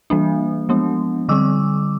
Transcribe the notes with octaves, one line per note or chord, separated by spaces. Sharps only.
E3 G3 A#3 D4
F3 G#3 B3 D4
D3 G3 C4 D6 E6